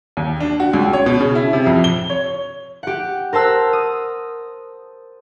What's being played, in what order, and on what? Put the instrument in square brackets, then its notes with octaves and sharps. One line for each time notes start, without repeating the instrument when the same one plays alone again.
[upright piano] D#2
D4
F#4
C#2
C#5
B2
C#3
E4
C3
F2
G7
C#5
[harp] G4 F#5
A#4 C5 A5 E6 F#6
D#6